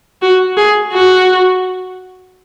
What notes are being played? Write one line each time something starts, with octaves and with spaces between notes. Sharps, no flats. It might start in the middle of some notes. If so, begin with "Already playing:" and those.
F#4
G#4
F#4